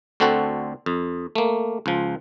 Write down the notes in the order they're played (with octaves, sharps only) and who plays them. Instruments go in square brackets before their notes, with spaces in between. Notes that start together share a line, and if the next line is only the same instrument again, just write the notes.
[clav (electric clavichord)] D2 D3 C4 F#4 A4 F#5
F2
A3 A#3
C#2 F3